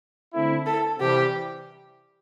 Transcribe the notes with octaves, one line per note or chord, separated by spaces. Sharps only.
D3 A3 C4 E4
A4
C3 E3 G3 G4